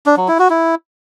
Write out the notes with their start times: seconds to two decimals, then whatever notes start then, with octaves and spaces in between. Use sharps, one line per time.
0.06 D4
0.17 F#3
0.28 E4
0.39 F#4
0.50 E4